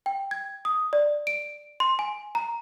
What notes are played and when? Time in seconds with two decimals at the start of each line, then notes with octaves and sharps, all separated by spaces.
0.06 G5
0.31 G#6
0.65 D#6
0.93 D5
1.27 D7
1.80 C6
1.99 G#5
2.35 A#5